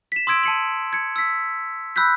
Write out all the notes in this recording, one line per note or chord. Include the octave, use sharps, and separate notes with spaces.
B6 E7
C6 D#6 E6 G#6 D7
A5 C#7 F#7
G#6 C#7
E6 B6
B5 E6 F#6 G6 B6